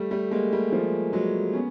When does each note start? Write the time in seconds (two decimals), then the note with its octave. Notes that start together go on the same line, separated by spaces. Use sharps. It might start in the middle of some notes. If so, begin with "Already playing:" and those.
Already playing: G3 A3
0.11 G3 A3
0.31 G#3 A#3
0.52 G3 A3
0.72 F3 G3
1.13 F#3 G#3
1.53 B3 C#4